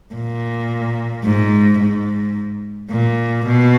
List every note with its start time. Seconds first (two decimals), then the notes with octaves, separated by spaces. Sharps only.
0.14 A#2
1.25 G#2
1.80 G#2
2.91 A#2
3.47 B2